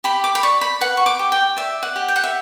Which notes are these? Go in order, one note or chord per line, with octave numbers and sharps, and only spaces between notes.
G4 B5
D6
B5
D5 C#6
B5
B4 F#5
C#6
D6
G4
G5
D5 E5
F#5
G4
G5
F#5
E5